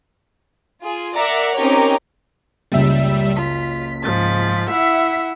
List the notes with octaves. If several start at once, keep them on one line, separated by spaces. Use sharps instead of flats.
F4 G#4
A#4 D5 E5 F#5 A#5
C4 C#4 D#4 G4 A#4 C#5
F#1 C#2 G3 E5
F4 B6
G#2 F3 A6
E4 E5 F#5